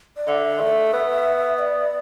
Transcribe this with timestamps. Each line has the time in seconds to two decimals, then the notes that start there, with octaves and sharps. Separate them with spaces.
0.17 D5
0.28 D3 E5
0.60 A3
0.93 B3
1.59 D5